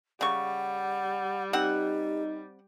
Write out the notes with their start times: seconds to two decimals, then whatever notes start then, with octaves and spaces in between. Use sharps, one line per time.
0.21 C#3 G3 F#5 C#6
1.53 C4 D#4 G4 F#5